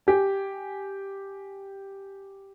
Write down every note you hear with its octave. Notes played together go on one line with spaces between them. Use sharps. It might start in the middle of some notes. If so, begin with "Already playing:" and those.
G4 G#5